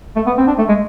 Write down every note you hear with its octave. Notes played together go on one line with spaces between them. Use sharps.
A3
B3
C4
D4
A3
G#3